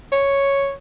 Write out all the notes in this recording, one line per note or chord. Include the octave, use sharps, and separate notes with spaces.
C#5